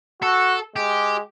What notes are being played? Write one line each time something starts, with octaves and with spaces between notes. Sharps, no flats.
F#4 A4
G#3 G4